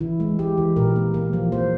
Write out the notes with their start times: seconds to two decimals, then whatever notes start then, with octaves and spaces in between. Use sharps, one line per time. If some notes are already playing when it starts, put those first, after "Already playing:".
0.01 E3 E4
0.20 G#3
0.39 G#3 G4
0.57 E3
0.76 A#2 A#4
0.96 A#3
1.14 A#3
1.33 F3
1.52 A#3 C5